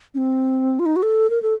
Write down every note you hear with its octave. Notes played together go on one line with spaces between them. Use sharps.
C#4
C4
F4
D#4
F#4
A4
A#4
A4